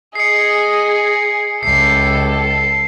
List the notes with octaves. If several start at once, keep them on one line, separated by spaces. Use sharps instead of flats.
G#4 D#5 C7 C#7
C#2 E4 G4 A4 C7